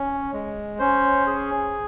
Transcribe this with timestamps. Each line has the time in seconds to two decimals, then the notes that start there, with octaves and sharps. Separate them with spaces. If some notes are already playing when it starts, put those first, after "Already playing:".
Already playing: C#4
0.33 G#3
0.79 C#4 C5
1.27 G#4